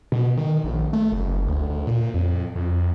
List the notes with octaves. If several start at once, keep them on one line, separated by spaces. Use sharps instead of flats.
B2
D#3
A#1
A3
F#1
D2
D2
A#2
F2
F2